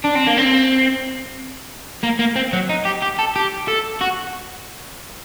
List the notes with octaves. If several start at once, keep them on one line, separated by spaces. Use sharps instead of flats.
D4
C4
A#3
C4
A#3
A#3
C4
F#3
D#4
G4
G4
A4
G4
A4
F#4